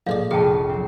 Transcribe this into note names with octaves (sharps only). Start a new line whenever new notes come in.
A#1 A2 G#3 D5 D#5 F5
F1 A#1 G#4 F5 G5 A5
F#3 C4